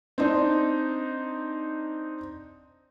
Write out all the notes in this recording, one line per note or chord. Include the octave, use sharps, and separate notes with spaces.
C4 D4 D#4